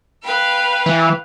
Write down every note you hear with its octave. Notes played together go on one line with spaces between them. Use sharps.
B4 F5 G5
E3